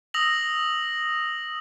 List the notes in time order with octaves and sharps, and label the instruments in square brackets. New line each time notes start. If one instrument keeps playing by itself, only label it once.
[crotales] D#6 E6 A#6 F7 F#7